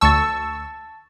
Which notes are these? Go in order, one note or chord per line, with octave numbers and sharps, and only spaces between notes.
D2 A5 C#6 E6 A6